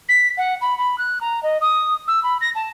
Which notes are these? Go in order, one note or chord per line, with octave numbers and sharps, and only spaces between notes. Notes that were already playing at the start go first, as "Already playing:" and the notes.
B6
F#5
B5
B5
F#6
A#5
D#5
D#6
E6
B5
A#6
A5